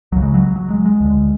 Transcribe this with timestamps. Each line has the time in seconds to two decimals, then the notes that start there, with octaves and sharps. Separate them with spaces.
0.12 C#2 C#3 F#3
0.22 G#3
0.34 F#3
0.56 F#3
0.70 G#3
0.86 G#3
1.00 D2 D3